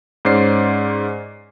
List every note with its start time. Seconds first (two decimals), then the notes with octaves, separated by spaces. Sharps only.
0.25 G#2 C#4 C5 D5 C7